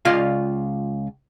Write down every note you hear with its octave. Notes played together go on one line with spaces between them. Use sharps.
C#2 F4 D5 D#5 F5